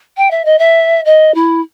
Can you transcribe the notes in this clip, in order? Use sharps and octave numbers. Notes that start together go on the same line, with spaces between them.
G5
E5
D#5
E5
D#5
E4